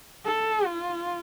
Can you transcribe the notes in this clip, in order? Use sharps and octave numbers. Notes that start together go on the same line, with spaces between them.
A4
F4